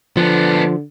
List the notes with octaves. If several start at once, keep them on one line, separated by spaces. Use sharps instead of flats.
D3 F3 B3 D4